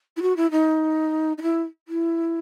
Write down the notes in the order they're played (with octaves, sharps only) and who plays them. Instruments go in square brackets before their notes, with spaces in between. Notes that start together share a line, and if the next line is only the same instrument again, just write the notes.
[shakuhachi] E4
F#4
E4
D#4
D#4
E4
E4